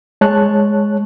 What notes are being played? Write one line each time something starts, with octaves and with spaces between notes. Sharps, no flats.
G#3 C#5 A5 F#6